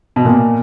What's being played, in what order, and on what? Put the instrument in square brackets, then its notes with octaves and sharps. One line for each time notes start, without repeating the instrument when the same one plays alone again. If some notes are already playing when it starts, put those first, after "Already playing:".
[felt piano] B2
A#2